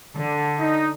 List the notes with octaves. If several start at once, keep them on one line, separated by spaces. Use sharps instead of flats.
D3
D#4